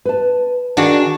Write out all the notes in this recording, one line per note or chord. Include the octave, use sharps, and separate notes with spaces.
B4 A5
D#3 D4 F#4 G#4